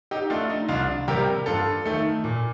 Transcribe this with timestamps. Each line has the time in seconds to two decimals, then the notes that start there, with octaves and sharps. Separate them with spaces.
0.11 D#4 G4
0.30 A3 D4 F4
0.49 D#4
0.69 C2 D4 F4
1.08 C3 G3 A#3 G4 A#4
1.46 G2 F4 A4
1.85 D#3 A3
2.24 A#2